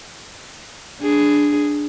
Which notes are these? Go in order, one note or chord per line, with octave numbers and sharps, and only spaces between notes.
D4 G#4